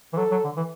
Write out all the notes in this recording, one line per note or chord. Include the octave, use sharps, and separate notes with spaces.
E3
F#3 A4
F#3
D3
E3